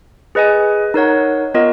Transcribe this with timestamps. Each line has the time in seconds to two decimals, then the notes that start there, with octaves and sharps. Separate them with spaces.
0.35 G#4 B4 D#5 G#5
0.94 D#4 A#4 C#5 F#5
1.54 B3 F4 A#4 D#5